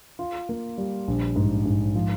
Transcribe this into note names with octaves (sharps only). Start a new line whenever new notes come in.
F4
A#3
G3
A#1
G#2
G#2
F3